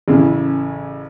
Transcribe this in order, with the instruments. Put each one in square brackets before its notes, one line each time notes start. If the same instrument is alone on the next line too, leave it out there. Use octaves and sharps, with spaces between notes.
[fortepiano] A1 C#3 E4